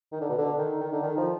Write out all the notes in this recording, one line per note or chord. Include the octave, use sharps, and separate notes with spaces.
D#3
D3
B2
D3
D#3
D#3
D3
D#3
F3